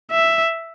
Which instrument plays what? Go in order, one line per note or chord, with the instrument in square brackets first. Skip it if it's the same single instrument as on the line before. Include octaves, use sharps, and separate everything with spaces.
[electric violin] E5